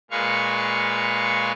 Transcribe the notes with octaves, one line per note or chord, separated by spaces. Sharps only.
A#2 G#3 B4 F5 C#6